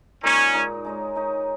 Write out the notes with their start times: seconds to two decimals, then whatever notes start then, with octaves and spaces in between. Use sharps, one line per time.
0.23 A#2 G#3 C#4 D#4 A#4
0.53 A#2 G#3 D#4 A#4
0.85 G#3 D#4 C#5
1.16 G#3 D#4 C#5